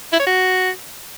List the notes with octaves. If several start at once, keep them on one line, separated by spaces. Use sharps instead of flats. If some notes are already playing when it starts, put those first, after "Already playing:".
E4
C#5
F#4